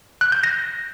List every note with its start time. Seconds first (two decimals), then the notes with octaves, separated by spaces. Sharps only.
0.21 F#6
0.32 G6
0.43 A#6